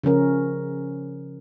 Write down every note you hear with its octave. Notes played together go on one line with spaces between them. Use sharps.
C#3 F3 C#4 A#4